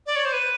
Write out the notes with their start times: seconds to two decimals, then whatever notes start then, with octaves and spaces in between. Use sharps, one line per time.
0.06 D5
0.16 C#5
0.25 C5
0.33 B4